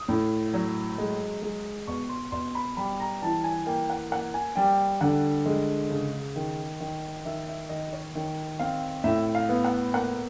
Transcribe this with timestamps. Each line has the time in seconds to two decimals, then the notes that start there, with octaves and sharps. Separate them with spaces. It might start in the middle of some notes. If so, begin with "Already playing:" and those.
Already playing: D#6
0.08 A2
0.54 F#3
0.98 G#3
1.42 G#3
1.88 B2 C#6
2.09 C6
2.32 B2 C6
2.55 B5
2.77 G3 B5
3.00 A#5
3.22 E3 A5
3.44 G#5
3.66 A#3 G5
3.90 F#5
4.11 A#3 F#5
4.34 G#5
4.56 G3 G5
5.01 D3 F#5
5.46 G#3
5.90 C#3
6.36 D#3
6.80 D#3
7.25 D#3 E5
7.48 E5
7.69 D#3 D#5
7.93 C#5
8.15 D#3
8.59 C4 F5
9.04 A2 E5
9.35 F5
9.49 B3
9.65 F#5
9.93 A#3 F#5